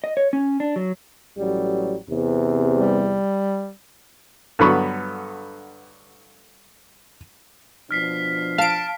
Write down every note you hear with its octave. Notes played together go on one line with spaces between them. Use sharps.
D#5
C#5
C#4
D4
F#3
A1 F#3 G3
E2 C3
G3
G2 D3 F#3 B3 B5 C#6
B2 F3 D4 F6 B6 C7
F5 A5 D7